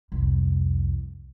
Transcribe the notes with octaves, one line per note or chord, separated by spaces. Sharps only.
C2 F2